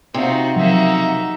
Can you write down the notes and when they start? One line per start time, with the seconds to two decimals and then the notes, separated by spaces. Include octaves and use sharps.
0.14 C3 D#4 F4 F#4 C5
0.56 C#3 F3 F#3 A#3 D#4 F#4 E5